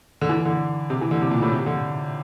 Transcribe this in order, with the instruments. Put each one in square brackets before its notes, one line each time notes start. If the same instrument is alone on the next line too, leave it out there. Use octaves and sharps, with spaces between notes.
[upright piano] D3
E3
D3
C3
E3
D3
C3
A#2
A2
C3
D3